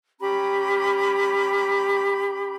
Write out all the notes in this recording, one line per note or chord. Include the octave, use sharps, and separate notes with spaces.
C#4 G4 A#5 B5